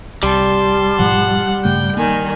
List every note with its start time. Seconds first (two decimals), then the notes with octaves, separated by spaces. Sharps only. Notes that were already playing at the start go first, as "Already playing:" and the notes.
0.23 C2 G3 A5 C6
0.99 G#2 B2 F3 F#5
1.65 G2 C#3 A3 G5
1.97 D#3 A#3 G#5